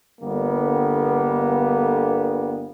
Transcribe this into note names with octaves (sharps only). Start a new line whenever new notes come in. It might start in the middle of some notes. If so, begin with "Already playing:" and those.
G1 D3 G3 A#3 B3